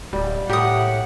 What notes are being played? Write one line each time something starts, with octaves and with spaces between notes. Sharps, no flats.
D1 G3
A2 G4 A#4 F#5 D#6